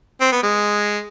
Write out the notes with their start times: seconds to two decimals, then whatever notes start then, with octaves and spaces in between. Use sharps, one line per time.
0.21 C4
0.32 B3
0.43 G#3